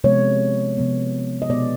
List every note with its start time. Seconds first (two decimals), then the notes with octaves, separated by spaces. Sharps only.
0.04 C3 F3 G#3 B3 C#5
0.78 C3 F3 G#3 B3
1.42 D#5
1.49 B2 G#3 B3 D5